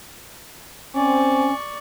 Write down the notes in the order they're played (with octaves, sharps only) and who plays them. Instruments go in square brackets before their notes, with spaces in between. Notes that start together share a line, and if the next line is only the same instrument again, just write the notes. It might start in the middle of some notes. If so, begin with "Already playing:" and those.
[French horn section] C4 [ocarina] C#4 [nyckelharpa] D5 C#6 [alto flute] G#5